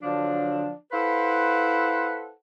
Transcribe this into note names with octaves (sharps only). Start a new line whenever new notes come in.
D3 F3 F#3 D4
E4 A4 B4 C5 F5 F#5